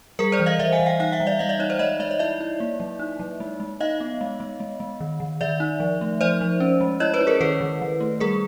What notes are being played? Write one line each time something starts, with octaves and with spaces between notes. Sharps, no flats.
G3 G#4 A#4
C5 D5
E3
D#5 F5
E3 D5 E5
F#5 G#5
E3
F5 G5
D#4 F5 G5
E5 F#5
G3
D5 E5
G3 D#5 F5
D5 E5
D#4 C#5 D#5
C5 D5
G#3 C#5 D#5
G#3 D5 E5
D#5
E4 D5 E5
E4
A#3
F#3
D#4
F#3
G#3
G#3
D#4 D#5 F5
B3
G#3
G#3
G#3
G#3
D#3
D#3
D#3 D5 E5
D#4
F3
A3
F3 C5 D5
F3
C#4
G#3
E4 C#5 D#5
B4 C#5
E4
G#4 A#4
D#3 A4 B4
D#3
D#3
A3
G3 G#4 A#4